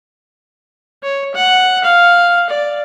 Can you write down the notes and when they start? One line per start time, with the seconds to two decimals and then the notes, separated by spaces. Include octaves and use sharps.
1.03 C#5
1.35 F#5
1.84 F5
2.50 D5